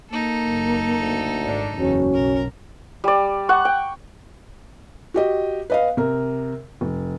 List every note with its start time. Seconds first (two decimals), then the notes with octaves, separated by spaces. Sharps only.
0.11 A#3 D#4 A4
0.46 F#1
1.01 D2
1.43 G#1 D4
1.79 F#1 E2 C#4 F#4
2.14 B1 A#4
3.04 G3 D5
3.49 F#5 C#6
3.65 G5
5.14 F#4 G4 D#5
5.70 B4 D#5 F5
5.97 C3 A#4
6.81 F1